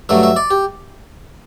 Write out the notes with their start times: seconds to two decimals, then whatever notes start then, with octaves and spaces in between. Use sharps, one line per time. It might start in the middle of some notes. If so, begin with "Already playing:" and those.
0.09 G2 F#3 A3 E5
0.23 E5
0.36 D5
0.51 G4